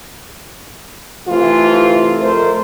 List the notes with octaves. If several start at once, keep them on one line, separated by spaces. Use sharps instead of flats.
C3 E3 A3 F4
F2 A3 A#4 C5